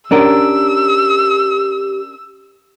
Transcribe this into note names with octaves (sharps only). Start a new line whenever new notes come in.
C#4 D4 G4 A#4 E6